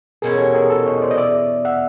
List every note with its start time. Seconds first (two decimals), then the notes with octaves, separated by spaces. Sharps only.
0.22 E2 B2 G#3 C#4 E4 G#4 A#4
0.38 G4 A4
0.55 G#4 A#4
0.70 A4 B4
0.86 C#5 D#5
1.02 C5 D5
1.11 D#5
1.18 D5 E5
1.65 E5 F#5